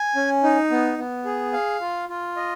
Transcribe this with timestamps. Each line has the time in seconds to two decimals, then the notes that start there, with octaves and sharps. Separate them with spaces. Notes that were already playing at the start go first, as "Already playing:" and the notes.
Already playing: G#5
0.16 C#4
0.43 D#4
0.71 B3
0.98 B3
1.25 G#4
1.53 F5
1.81 F4
2.09 F4
2.36 D#5